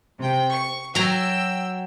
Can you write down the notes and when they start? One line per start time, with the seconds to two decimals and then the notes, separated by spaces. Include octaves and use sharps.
0.19 C3 G5
0.51 C#6
0.95 F#3 G5 A#5 E6